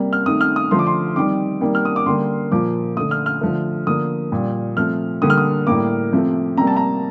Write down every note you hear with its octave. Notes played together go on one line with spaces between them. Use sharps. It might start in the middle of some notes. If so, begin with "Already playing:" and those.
Already playing: C3 G3 A#3
F6
C3 D#3 A3 D#6
F6
D#6
D3 F3 A3 C6
D6
C6
C3 D#3 G3 D6
C3 D#3 G3 A#3
F6
D#6
D6
D3 G3 A#3 C6
A#2 F3 A#3 D6
D3 A3 D#6
F6
F6
D3 F3 A3
D3 F3 A#3 D#6
A#2 G3 A#3
C3 F3 A3 F6
D3 G3 A#3 D#6
F6
D#6
A2 G3 A#3 D6
C3 F3 A3
C3 G3 A#3 A#5
A5
A#5